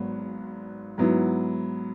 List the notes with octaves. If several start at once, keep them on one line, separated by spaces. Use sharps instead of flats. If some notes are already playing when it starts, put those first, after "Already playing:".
Already playing: G#1 G#2 F#3 B3
G#2 F#3 B3 E4